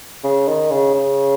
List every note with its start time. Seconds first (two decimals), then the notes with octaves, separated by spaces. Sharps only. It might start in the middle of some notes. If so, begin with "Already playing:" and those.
0.24 C#3
0.48 D#3
0.71 C#3
0.94 C#3